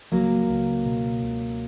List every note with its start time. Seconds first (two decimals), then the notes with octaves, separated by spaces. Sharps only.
0.11 C#2 F#3 A#3
0.49 C#2
0.86 B2
1.23 C#2